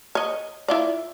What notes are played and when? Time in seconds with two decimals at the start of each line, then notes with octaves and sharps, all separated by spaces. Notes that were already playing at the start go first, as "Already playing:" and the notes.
0.15 C#5 D#5
0.68 E4 F4 D5